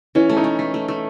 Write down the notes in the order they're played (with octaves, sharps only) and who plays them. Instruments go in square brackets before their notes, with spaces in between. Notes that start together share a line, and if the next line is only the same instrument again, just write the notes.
[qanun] E3 [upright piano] C#4
[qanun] A3
[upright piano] C#4 D#4
[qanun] A3
A3
A3
A3